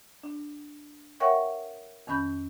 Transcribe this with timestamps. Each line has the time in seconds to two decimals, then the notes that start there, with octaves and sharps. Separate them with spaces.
0.23 D4
1.20 A#4 C#5 E5 F#5 G5 C#6
2.07 F2 D#3 C#4 B5 G6